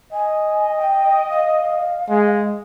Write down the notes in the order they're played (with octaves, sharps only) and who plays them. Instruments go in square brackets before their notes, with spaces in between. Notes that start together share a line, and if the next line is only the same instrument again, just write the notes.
[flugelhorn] D#5 [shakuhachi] G#5
[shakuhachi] G5
F5
[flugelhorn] G#3